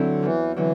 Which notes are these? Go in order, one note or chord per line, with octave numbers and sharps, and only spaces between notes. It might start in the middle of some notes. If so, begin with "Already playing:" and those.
Already playing: D3 F#3 C4 E4
E2 E3
D3 E3 F#3